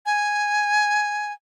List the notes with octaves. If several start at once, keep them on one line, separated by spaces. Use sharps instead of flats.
G#5